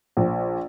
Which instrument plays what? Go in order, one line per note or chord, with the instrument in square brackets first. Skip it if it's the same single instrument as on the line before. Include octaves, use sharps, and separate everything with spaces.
[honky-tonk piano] A#1